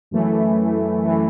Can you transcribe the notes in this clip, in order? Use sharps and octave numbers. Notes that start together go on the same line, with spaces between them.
F#2 E3 A3
E3 A3